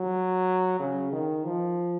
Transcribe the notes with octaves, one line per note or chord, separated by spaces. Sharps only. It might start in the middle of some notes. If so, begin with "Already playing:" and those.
Already playing: F#3
C#3
D#3
F3